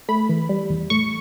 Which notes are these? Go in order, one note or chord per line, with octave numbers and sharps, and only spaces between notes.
A3 B5
E3
G3
E2
A2 C#6